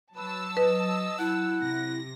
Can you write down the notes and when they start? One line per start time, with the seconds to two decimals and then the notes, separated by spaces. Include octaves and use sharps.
0.16 F#3 B4 A5 E6
0.57 B4 D#5
1.19 E4 F#5
1.62 C3 A#6